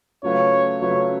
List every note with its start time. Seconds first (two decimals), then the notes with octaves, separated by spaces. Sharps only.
0.23 C#3 F#3 A3 F4 B4 C#5
0.82 C#3 F#3 A3 F4 B4 C#5